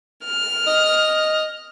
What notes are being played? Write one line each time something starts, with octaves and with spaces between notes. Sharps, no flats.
F6
D#5